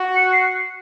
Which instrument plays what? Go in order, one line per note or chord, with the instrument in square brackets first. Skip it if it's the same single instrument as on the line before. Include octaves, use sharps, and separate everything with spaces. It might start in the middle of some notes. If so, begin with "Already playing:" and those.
Already playing: [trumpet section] F#4
[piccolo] C#7
C7